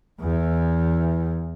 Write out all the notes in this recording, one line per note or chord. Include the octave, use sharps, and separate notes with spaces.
E2 E3